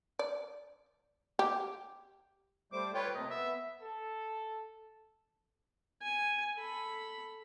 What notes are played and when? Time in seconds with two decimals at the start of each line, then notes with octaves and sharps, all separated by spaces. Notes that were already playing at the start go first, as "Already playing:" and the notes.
0.19 D5
1.39 G4
2.72 G3 A3 C5 D6
2.94 F4 B4 C#5 G5
3.15 C3 A3 A#3 D#5
3.30 B3 E5
3.82 A4
6.02 G#5
6.57 A4 B5